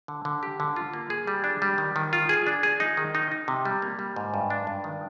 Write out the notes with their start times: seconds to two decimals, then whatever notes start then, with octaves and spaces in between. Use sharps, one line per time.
0.08 D3
0.25 D3
0.43 G4
0.60 D3
0.76 F4
0.93 A#3
1.10 G#4
1.27 G3
1.44 D4
1.62 G3
1.78 D#3
1.96 D#3
2.13 F4
2.29 G#4
2.47 D4
2.63 G#4
2.80 D#4
2.97 D#3
3.15 D#4
3.31 D#4
3.48 C3
3.65 G3
3.82 A#3
3.99 G3
4.16 G#2
4.34 G2
4.50 D4
4.67 G2
4.84 D#3